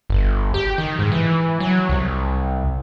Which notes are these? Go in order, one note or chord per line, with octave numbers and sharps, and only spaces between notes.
G1
G4
D#3
G#2
E3
F#3
C2